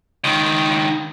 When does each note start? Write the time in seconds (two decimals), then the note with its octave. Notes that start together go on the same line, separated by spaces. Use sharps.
0.24 C#2 D#3